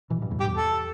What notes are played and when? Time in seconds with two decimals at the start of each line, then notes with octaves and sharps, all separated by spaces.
0.10 B2 E3
0.22 G2 B2
0.31 E2 A2
0.39 G2 G4
0.48 E2
0.57 A4